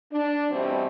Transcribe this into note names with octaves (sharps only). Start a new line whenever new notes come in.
D4
B2 E3 G3 A3 C4